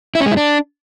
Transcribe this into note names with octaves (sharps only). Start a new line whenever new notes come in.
E4
C#4
G#3
E4
D4